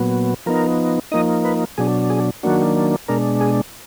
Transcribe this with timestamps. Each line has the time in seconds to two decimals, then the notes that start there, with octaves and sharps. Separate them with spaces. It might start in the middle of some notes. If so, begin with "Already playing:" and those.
Already playing: A#2 F#3 B3
0.46 F3 B3 D#4 A#4
1.12 F3 A#3 D#4 D#5
1.45 B4
1.78 B2 F#3 D4 G#4
2.10 G#4
2.43 D#3 F#3 A#3 D4 F#4
3.08 B2 G#3 D4 A#4
3.41 G#4